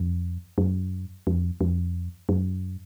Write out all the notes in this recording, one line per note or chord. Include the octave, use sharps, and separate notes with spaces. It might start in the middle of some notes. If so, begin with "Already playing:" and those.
Already playing: F2
F#2
F2
F2
F#2